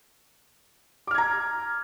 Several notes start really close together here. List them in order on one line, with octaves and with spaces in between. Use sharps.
D6 F6 G#6 A#5